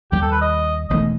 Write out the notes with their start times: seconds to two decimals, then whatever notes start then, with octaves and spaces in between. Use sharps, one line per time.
0.12 D#2 D#3 G3 G4
0.22 A4
0.32 B4
0.41 D#5
0.89 E1 E2 D#3 A3 D#5